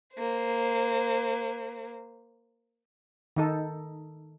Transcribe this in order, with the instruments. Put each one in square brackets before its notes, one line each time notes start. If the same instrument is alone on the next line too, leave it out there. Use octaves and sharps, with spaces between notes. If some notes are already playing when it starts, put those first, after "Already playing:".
[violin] A#3 C5
[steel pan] D#3 D#4 A4